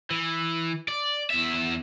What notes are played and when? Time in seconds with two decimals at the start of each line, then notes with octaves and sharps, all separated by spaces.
0.11 E3
0.88 D5
1.30 E2 E5